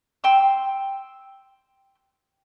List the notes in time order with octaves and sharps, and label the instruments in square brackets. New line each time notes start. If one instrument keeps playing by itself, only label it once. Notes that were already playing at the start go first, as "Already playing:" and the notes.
[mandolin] G5 C6 E6